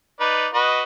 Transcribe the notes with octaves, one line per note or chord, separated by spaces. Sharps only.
D#4 B4 D5
F#4 B4 D#5